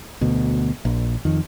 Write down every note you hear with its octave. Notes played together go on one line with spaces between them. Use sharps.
D2 B2
A#1
F2 D#3